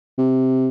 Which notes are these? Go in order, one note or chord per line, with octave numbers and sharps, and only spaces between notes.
C3